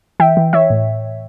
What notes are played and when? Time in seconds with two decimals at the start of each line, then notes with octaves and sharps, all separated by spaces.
0.20 E3 E5 G5
0.37 E3
0.53 E3 C#5 E5
0.70 A2